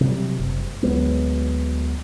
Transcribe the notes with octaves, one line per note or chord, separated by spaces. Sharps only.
C3 F#3 G3
F#1
D2 F#3 G#3 B3